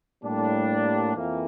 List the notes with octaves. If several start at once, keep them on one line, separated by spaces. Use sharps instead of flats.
A2 G3 A#3 D4
F2 E3 A#3